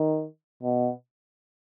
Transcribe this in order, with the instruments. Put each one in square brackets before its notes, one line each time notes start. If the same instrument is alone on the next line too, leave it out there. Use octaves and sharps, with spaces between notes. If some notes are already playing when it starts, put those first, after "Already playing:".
Already playing: [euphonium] D#3
B2